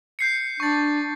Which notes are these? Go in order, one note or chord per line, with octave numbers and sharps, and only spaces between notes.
G6 C7 C#7
D4 C#6 A6